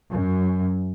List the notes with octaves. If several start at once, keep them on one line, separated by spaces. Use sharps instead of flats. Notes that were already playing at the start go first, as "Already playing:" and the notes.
F#2